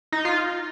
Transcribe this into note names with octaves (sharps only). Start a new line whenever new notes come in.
D#4
F4